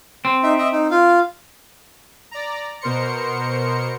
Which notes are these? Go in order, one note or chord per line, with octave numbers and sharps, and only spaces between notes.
C4
D#4 E5
D#5 E5
D#4
F4 F5
D5 A#5
B2 A#4 C5 C#7